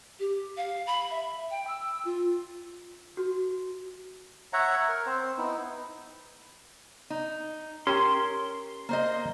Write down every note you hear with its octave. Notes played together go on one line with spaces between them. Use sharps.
G4
F5
B5
E5
G5
E6
F4
F#4
C#5 E5 F#5 A#5
A#4
C4 C5
B3 D#4 E4
D#4
C#4 G4 A#4 G5 C6
A#3 C5 D#5